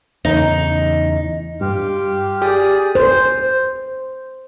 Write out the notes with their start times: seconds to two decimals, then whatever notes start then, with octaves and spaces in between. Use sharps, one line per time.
0.25 E2 C#3 D#4
1.61 G2 F4 G4
2.42 G4 G#4 D5 D#6
2.95 C5